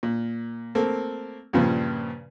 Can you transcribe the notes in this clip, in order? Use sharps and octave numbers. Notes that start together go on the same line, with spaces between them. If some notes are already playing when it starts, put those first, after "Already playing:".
A#2
A3 A#3 C4
G2 A#2 C#3 F3